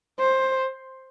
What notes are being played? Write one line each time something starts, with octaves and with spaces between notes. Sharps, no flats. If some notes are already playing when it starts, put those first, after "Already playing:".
C5